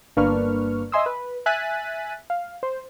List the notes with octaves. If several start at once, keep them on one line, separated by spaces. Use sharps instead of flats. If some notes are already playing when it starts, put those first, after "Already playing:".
G1 A#3 D4 B4 C#6 F6
D#5 E5 G#5 C6 D#6 E6
B4
E5 G#5 F#6 A6 B6 D#7
F5
C5